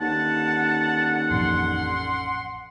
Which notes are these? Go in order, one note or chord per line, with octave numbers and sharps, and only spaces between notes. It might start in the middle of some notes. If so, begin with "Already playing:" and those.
D#2 D3 C#4 F#5 A5
A1 F2 C6